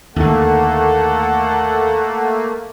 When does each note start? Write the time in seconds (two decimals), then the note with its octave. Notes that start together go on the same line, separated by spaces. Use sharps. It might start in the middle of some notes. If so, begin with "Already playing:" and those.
0.16 D#2 D3 A3 A#3 A4 F#5